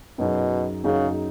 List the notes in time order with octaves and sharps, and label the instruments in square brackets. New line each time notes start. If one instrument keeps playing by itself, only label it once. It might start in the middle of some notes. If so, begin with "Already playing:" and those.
[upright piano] F#2 F#3 D#4 G#4 [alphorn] B2
[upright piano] F#2 F#3 D#4 G#4 [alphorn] C#3